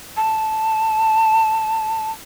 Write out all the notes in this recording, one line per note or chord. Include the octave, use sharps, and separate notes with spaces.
A5